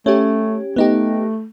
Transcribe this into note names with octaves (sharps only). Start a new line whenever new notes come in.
A3 C#4 G4
A3 B3 D#4 G4